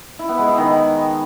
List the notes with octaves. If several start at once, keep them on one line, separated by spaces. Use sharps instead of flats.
E4
B3
G#3
E4
D#3